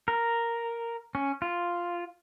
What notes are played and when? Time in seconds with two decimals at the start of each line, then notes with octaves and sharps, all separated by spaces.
0.08 A#4
1.15 C#4
1.42 F4